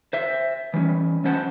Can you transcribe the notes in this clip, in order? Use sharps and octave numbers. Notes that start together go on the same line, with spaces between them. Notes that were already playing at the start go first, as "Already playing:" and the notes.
C5 E5
E3 G3 C4 C#4
F3 C#4 C5 F#5 A5